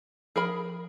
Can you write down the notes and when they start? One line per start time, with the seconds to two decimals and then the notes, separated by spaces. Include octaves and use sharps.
0.36 F3 G#4 A#4 B5